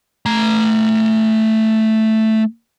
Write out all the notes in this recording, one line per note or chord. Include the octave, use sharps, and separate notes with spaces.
A3 A#5